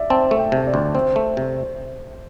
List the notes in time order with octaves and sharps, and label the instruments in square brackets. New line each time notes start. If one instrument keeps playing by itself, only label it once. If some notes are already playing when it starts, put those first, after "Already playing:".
Already playing: [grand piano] D5 E5
[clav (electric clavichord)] C4 [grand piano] A5
[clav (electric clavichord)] A3
[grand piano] G5
[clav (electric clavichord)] C3
[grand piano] D5
[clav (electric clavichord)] D2
[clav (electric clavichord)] C4 [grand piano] C5
[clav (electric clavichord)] A3
C3